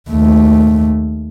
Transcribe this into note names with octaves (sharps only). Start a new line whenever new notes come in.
D#2 A3